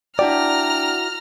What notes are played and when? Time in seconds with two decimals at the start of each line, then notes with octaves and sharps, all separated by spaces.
0.19 D4 E4 F#4 D5 G5 A#5 F6